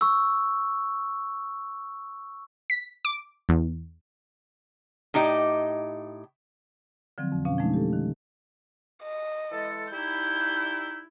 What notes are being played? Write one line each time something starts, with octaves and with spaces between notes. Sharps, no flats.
C#6 E6
B6
D6
E2
A2 D#4 G4 D#5
D3 F3 F#3 G#3 C4
F2
B2 C#4 F5
F3 F#3 G#3 A3 D4 D#4
G4 A4
D#3
D#5
E3 G#3 A4
G3 D#4 E4 G6